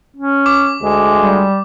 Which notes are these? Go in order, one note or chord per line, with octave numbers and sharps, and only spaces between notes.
C#4
D6
D2 G#3
G3